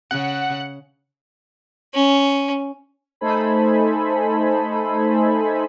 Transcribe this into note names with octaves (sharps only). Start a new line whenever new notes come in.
C#3 F#5
C#4
A3 D#4 A4 C5 G#5 B5